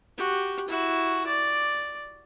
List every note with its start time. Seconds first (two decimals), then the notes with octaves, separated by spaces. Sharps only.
0.17 F#4 G4
0.68 E4 F#4
1.26 D5